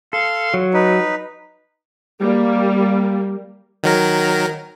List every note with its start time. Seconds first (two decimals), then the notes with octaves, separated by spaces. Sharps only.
0.13 A4 F5 C6
0.54 F#3
0.74 D#4 B4
2.20 G3 A#3
3.83 D#3 F#3 A#4